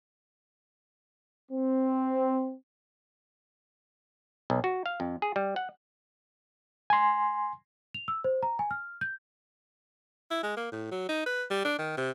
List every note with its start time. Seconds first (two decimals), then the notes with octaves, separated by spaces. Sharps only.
1.50 C4
4.50 B1
4.64 F#4
4.86 F5
5.00 F2
5.22 G#4
5.36 G3
5.56 F#5
6.90 G#5 C6
7.94 F7
8.08 E6
8.24 C5
8.43 A#5
8.59 G#5
8.71 F6
9.01 G6
10.31 E4
10.43 G#3
10.57 A#3
10.72 A2
10.92 F#3
11.09 D#4
11.26 B4
11.50 G3
11.65 D4
11.79 D#3
11.97 C3